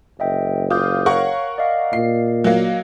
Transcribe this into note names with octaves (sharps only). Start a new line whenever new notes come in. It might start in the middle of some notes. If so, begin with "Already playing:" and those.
F#1 D#5 E5 G5
F4 D6 D#6 G6
A#4 C#5 F5 F#5 C#6
D5 D#5 F5
A#2 C7
F#3 A#3